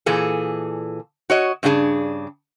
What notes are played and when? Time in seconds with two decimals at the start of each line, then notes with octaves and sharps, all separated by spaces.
0.06 A#2 E3 G#4 A4
1.30 F#4 C#5 D#5
1.63 G2 C#3 D4 F#4 G#4 A5